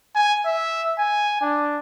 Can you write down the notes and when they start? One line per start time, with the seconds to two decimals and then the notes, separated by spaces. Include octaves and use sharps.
0.15 G#5
0.46 E5
0.99 G#5
1.42 D4